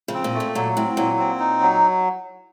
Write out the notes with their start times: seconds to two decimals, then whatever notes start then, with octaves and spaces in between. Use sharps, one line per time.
0.08 C#3 F3
0.14 C4
0.24 A#2
0.34 A3
0.40 A#2
0.55 A#2 F#3
0.76 A2 C4
0.97 A#2 F#3
1.19 C4
1.39 D#4
1.61 F#3